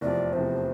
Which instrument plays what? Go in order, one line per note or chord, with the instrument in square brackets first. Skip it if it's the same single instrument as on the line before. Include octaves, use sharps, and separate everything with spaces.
[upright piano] F1 E2 C3 F3 [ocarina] D5
[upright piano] F1 E2 C3 F3 [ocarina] C5